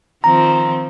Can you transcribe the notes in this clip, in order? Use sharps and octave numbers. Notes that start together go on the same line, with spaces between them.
D#3 F3 C4 A#5